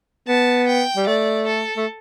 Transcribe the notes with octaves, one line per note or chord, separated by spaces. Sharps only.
B3 A5
G5
G3
A3 D5
A4
A3